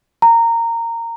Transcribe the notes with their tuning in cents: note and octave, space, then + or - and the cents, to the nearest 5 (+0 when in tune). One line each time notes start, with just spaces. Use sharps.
A#5 -15